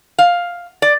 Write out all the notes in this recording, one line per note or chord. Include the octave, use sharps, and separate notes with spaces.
F5
D5